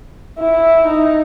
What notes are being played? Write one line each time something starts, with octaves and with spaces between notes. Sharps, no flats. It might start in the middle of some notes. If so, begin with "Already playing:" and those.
E4
D#4